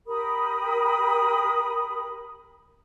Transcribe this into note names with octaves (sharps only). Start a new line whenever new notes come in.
G4 A#4 B5 D#6